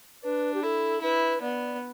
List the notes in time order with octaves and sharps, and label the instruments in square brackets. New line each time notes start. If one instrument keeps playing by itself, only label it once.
[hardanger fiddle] D4 [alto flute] B4
[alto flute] G4
[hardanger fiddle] E4 [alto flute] A4
[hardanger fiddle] E4 [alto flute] B4
[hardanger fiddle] B3 [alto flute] D5